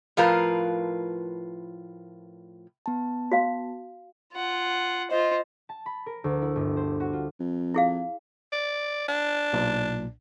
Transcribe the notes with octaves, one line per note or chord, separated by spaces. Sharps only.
A2 F3 F4 A#4 B4
B3 A5
F#4 F5
F4 F#5
F4 C5 D#5
A5
B5
A#4
D2
E4
G1
C5
F#4
F4
F2
E4 G#4 F5
D5
D4
B1 A#2